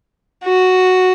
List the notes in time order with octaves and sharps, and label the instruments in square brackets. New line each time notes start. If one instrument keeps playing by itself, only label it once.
[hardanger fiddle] F#4